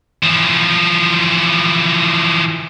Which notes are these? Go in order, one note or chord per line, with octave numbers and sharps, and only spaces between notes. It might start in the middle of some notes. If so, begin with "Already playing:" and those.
E3 F3